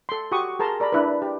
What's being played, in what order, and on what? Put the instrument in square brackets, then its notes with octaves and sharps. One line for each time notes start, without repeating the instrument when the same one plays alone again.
[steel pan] A4 C6
F#4 G4 F#5 C#6 D#6
G#4 A#4 A5 A#5 C6
A#4 D5 A#5 B5
D4 E4 B4
G4